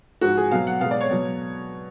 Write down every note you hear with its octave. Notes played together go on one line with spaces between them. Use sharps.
G#2 F3 G#3 F#4
G#4
B2 F#3 F5
F#5
B2 G#3 F5
D5
C#5
B2 F#3